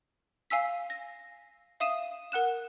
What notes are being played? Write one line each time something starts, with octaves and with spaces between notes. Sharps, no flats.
F5 G#5 E6 B6
A#6
E5 F5 D#6 D#7 E7
A#4 F#5 F#6 E7